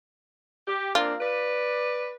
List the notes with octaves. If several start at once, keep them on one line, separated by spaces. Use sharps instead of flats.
G4
A#3 C4 D4 F4
B4 D5